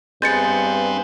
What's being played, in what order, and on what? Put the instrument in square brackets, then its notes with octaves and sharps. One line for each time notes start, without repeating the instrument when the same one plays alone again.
[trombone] G2 [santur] G#3 [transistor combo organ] B3 C4 [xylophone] G6 A6 C#7